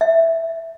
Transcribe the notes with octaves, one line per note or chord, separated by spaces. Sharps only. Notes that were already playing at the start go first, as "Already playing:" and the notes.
E5